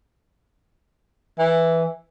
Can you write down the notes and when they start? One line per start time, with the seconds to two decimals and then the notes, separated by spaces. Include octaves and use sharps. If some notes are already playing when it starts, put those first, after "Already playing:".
1.39 E3